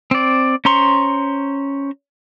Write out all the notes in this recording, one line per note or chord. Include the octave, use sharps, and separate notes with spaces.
C4 D5
C#4 C5 A#5 C6 C#6